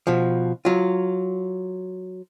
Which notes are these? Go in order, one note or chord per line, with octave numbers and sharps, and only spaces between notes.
B2 F3
F#3 F4